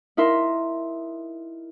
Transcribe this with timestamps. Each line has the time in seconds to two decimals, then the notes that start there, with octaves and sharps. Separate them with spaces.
0.17 D#4 E4 A#4 E5 C6